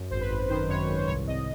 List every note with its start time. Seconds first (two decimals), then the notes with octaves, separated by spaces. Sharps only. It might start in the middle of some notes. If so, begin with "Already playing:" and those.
Already playing: F#2
0.10 G#1 C5
0.20 B4
0.30 G#1
0.49 D#3 C5
0.68 F#2 C#5
0.88 G#1
0.97 C5
1.07 C2 C#5
1.27 C2 D#5